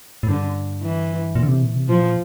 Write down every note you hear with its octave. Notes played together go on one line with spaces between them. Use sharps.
A2
G2 D3
E3
A#2
D3
C3
A#2
C3
A#2 F3